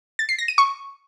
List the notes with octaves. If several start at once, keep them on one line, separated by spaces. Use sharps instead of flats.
A6
C7
A#6
D#7
C#6